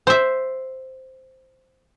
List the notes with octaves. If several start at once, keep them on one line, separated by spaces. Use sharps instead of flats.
C5 E5